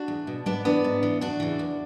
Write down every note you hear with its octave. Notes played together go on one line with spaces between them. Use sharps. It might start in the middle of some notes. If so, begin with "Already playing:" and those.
Already playing: D4 F#4
E2
B2
G#2 B3 D4
E3 B3 D4
G#2
E3
E2 D4 F#4
C#3 E3
E2